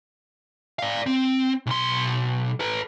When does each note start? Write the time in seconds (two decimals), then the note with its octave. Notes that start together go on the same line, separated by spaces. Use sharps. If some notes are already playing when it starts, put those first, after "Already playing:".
0.79 D5 F5
1.06 C4
1.66 B1 C6
2.60 A4 B4